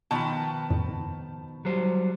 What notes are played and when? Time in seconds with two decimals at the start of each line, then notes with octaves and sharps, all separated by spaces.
0.11 B2 D#3 F3 A5 B5
0.70 F2 A2 C#3
1.65 F#3 G3 C5